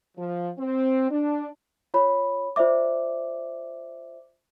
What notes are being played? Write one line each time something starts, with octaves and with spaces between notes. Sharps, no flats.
F3
C4
D4
F4 C#5 B5
F4 C5 D5 E5 D6